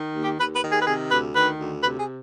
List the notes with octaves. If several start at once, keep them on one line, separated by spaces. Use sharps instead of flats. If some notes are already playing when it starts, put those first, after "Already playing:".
Already playing: D#3
D#2
G4
D#2 B4
B4
D#3
G#4
B4
C3 G#4
D2 B4
D#3 B4
D2
C3 B4
G#4